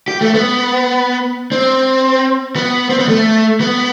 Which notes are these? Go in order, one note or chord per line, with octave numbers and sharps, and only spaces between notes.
G4
A3
B3
C4
B3
C4
B3
A3
B3